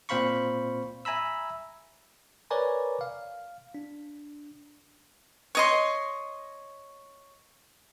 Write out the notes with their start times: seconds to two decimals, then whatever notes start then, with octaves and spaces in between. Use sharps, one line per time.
0.09 A#2 C4 C5 F5 B5 C#6
1.05 E5 G#5 A#5 B5 E6
2.51 A#4 B4 C#5 D5 G#5 A#5
3.01 F5
3.74 D4
5.55 C#5 D#5 C6